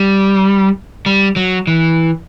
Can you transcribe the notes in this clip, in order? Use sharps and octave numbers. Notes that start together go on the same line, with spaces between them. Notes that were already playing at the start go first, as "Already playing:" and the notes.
Already playing: G3
G3
F#3
E3